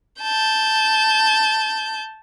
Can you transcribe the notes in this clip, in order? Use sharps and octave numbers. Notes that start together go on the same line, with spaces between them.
A5 G6